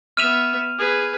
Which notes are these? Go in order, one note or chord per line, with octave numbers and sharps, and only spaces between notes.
B3 E5 F6 D#7 F7
G#4 B4